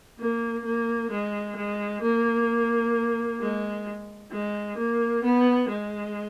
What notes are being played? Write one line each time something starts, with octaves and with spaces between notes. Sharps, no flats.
A#3
A#3
G#3
G#3
A#3
G#3
G#3
A#3
B3
G#3